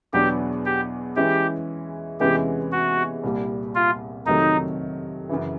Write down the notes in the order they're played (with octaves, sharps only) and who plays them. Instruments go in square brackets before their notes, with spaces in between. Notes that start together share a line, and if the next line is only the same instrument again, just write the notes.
[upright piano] E2 B2 F#3 B3 D4 [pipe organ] G4
[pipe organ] G4
[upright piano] E3 G#3 C#4 E4 [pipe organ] G4
[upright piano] E2 C3 E3 G#3 C#4 [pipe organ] G4
[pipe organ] F#4
[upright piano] C2 A#2 G3
[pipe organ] F4
[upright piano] F2 C3 D#3 F#3 A3 [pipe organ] D#4
[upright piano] F#2 C#3 E3